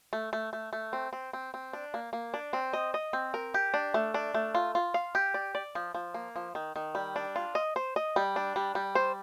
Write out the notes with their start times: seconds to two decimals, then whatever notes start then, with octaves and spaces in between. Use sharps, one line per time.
0.13 A3
0.33 A3
0.53 A3
0.73 A3
0.93 C4
1.13 C4
1.33 C4
1.54 C4
1.73 D4
1.94 A#3
2.13 A#3
2.34 D4
2.53 C4
2.73 D#5
2.94 D#5
3.13 C4
3.34 A#4
3.54 G4
3.74 D4
3.94 A3
4.14 D4
4.34 A3
4.55 F4
4.75 F4
4.94 F5
5.15 G4
5.34 D5
5.55 D5
5.75 F3
5.95 F3
6.14 A#3
6.36 F3
6.55 D#3
6.76 D#3
6.95 G3
7.16 D4
7.36 F4
7.55 D#5
7.76 C5
7.96 D#5
8.16 G3
8.36 D4
8.56 G3
8.75 G3
8.95 C5